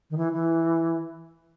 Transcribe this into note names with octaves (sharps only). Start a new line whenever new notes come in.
D#3
E3
E3